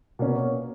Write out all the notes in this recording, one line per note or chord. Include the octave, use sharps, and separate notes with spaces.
B2 A#3 C#4